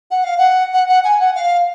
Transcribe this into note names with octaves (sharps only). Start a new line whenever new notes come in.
F#5
F5
F#5
F#5
F#5
G#5
F#5
F5